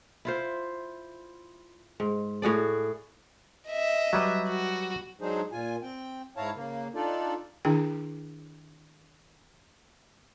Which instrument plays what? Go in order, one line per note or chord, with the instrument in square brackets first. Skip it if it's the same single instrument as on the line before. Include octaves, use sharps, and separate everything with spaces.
[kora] E4 F4 C5
G#2
A2 F#4 G#4 D5
[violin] D#5 E5
[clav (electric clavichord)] F#3 G3 B4
[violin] F#4
[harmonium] F#3 G#3 D4 D#4 G#4 C5
A#2 F4 G#5
C4 G5
G#2 E4 C#5 F5 A5 A#5
C#3 A#3
D4 D#4 F4 A4 D5
[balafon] D#3 D4 E4 G#4 G5